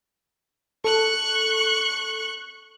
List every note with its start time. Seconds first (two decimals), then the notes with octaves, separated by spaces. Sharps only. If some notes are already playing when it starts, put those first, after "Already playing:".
0.84 A4 C#6 F#6